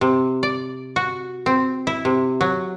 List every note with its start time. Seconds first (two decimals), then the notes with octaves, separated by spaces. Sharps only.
0.01 C3
0.43 D5
0.96 F#4
1.46 C4
1.87 E4
2.05 C3
2.41 F#3